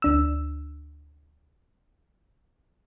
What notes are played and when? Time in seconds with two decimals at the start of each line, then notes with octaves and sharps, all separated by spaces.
0.02 D2 D4 E6